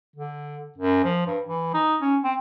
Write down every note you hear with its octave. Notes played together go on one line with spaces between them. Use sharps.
D3
F#2
F3
G2
E3
D#4
C#4
C4